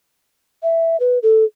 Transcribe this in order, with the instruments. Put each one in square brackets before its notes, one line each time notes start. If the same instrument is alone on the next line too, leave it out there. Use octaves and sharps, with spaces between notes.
[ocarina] E5
B4
A4